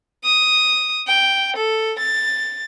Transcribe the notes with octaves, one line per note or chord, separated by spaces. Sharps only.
D#6
G5
A4
A6